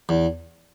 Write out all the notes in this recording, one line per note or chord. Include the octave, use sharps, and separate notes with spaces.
E2